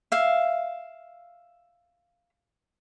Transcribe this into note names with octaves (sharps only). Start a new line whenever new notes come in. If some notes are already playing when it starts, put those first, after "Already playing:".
E5 F5